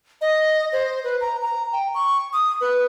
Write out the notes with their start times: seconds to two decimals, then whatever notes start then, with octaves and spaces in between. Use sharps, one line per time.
0.21 D#5
0.73 C5
1.04 B4
1.21 A#5
1.42 A#5
1.73 G5
1.95 C#6
2.33 D#6
2.61 B4